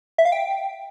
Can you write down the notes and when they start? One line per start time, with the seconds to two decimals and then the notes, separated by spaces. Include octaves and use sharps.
0.18 E5
0.25 F5
0.32 G5